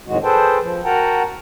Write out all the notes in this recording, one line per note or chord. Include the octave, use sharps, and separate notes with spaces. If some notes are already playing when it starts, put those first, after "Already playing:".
F2 A2 D#3 G#3 F#4
G#4 A4 B4 C5 G5 A5
F3
F#4 A#4 F#5 G5 A5 A#5